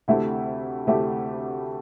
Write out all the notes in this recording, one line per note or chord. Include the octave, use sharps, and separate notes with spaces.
D2 C3 A3 E4 G4
D2 C3 A3 E4 G4